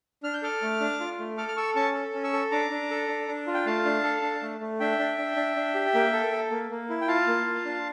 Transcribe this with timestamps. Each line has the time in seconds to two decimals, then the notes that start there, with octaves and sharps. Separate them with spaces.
0.23 D4 F6
0.34 G6
0.42 A4 D6 F6
0.62 A3
0.80 D4
1.00 F4
1.19 A3
1.37 A4 D6 F6
1.48 F6
1.57 A4 C#6 E6
1.75 C#4 A5 C#6
1.94 A4
2.13 C#4
2.23 C#6 E6
2.33 A4
2.51 D4 A#5 D6
2.70 D4
2.90 A4
3.08 D4
3.28 D4
3.47 F4
3.54 G5
3.65 A3 F5 A5
3.85 D4
4.04 A4
4.22 D4
4.42 A3
4.60 A3
4.80 D4 E5 G5
4.99 D4
5.18 D4
5.37 D4
5.56 D4
5.75 G4
5.94 A#3
6.13 A4
6.32 A4
6.51 A#3
6.71 A#3
6.89 E4
7.01 G5
7.08 F4 F5 A5
7.27 A#3
7.47 F4
7.65 D4